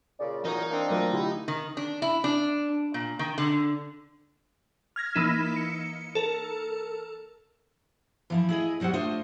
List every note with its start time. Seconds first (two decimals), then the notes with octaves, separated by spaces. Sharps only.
0.19 A#2 C#3 D5
0.45 F#2 A#2 E3 D#4 A#4 C#5
0.70 A#3 C4 D4
0.90 F#3 A3 F4 A#4
1.13 D3 E4 F4 G4
1.48 D#3
1.77 D4
2.02 E4
2.24 D4
2.94 A#2
3.19 D#3
3.38 D3
4.96 F6 G#6 A#6
5.15 E3 A#3 D#4 B6 E7
5.56 C#7
6.15 A4 A#4
8.30 E3 F3 E4
8.49 E4 G#4 D#5
8.80 B2 F#3 G3 C5 F#5
8.93 A3 D4 F4 C5 D#5